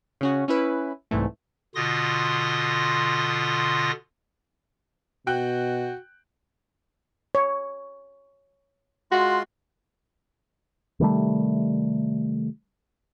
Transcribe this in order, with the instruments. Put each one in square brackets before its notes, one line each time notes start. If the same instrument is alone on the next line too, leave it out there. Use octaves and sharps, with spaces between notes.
[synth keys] C#3 C#4 F#4
C#4 E4 B4
C2 G#2 E3 A3
[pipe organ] B2 D3 F4 C6 D#6 A#6
[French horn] B2 [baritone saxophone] F#4 [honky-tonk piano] G5 F#6
[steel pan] C#5
[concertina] G#3 F4 C6 [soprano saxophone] F#4
[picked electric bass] C3 D#3 G3 A3